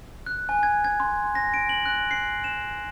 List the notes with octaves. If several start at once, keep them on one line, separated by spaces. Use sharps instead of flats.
F#6
G#5
G#6
G#6
C6
A#6
D7
F#7
F#6
C7
E7